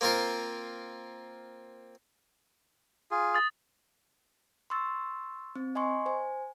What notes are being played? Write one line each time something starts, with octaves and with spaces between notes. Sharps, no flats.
A#3 C4 F4 A#4 C5
F4 G#4
D#6 A6
C6 C#6 E6 A6
C4
D#5 G#5 C6 C#6
C5 G#5